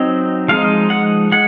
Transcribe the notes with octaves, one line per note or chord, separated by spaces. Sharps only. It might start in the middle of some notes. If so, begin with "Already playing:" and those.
Already playing: F#3 C4 D#4
F3 G#3 D#4 F5
F#5
G#3 F#5